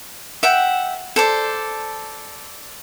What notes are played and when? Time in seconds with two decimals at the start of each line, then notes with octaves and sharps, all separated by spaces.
0.43 E5 F#5 G5
1.16 A4 C5 D5